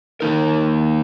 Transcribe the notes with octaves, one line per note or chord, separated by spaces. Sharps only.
D#3 A#3 D#4 A#4